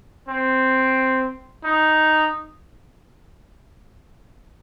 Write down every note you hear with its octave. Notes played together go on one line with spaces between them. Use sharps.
C4
D#4